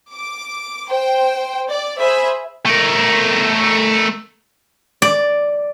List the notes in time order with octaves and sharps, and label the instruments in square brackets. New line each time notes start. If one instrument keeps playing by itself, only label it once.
[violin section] D6
C5 G5
D5
G#4 C5 E5 B5
[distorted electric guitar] A3 A#4
[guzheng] D5